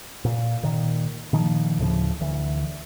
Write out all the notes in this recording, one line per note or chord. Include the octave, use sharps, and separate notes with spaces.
A#2
A#2 D#3
A#2 D#3 F3
D2 A2 C#3 F3
D2 E3